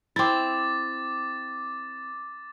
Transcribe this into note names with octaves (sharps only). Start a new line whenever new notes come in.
C4 E4 D6 A6